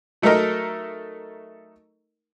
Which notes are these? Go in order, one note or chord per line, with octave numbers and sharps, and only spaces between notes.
F#3 A3 D#4 A4 A#4 D#5